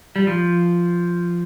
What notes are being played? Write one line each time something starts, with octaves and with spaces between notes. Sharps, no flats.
G3
F3